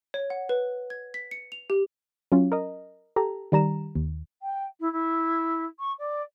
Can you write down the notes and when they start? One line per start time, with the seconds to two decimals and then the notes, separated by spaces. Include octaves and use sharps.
0.14 C#5
0.30 F#5
0.49 B4
0.90 G#6
1.14 B6
1.31 C#7
1.52 F7
1.70 G4
2.32 F#3 C#4 F4
2.52 A#4 D#5
3.16 G4 A4 A#5
3.52 D#3 G3 A#5 E7
3.95 D#2
4.42 G5
4.80 E4
4.92 E4
5.79 C#6
5.99 D5